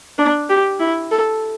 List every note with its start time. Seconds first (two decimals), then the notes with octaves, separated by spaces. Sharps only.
0.18 D4
0.49 G4
0.79 E4
1.11 A4